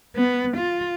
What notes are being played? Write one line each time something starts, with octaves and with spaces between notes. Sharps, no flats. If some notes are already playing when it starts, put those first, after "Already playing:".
B3
F4